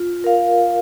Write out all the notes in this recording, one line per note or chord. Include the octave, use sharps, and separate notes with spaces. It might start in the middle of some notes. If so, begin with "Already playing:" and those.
Already playing: F4
A#4 F5